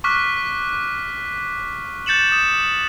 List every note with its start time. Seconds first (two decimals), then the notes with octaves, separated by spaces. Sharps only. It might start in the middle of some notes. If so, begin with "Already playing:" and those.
0.04 C#6 D6 F6 F#6 B6
2.06 G6 A6 C#7 E7 F#7
2.32 D#6 E7